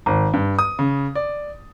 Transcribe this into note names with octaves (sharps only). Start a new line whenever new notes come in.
G#1
G2
D#6
C#3
D5